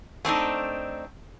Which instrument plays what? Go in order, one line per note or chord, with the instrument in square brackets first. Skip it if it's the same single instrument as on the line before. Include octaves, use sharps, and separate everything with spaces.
[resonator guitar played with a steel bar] A3 C4 D4 D#4